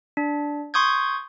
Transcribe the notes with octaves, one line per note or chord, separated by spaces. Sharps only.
D4
C6 C#6 D#6 G6 G#6